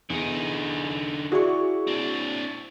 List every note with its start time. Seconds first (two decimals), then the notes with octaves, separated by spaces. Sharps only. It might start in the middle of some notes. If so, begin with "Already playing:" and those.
0.10 E2 D3 D#4
1.32 E4 F#4 G#4 D5 C#6
1.87 C4 D4